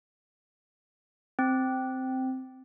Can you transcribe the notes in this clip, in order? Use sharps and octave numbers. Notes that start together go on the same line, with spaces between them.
C4